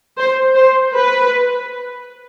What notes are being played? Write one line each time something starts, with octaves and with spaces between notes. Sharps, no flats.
C5
C5
B4